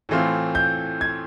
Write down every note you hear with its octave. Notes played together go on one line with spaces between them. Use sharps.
A2 E3 A3 C4 F4
G6
G#6